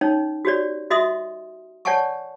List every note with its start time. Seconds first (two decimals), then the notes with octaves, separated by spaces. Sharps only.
0.01 C#4 D#4 C#5
0.45 F#4 G4 C#5 D5
0.90 F#4 D#5 E5 C6 D#6
1.85 C#5 D5 F#5 G#5 A5 C#6